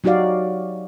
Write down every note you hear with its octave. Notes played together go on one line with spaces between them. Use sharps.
F#3 D#4 F#4 G4 D5 F5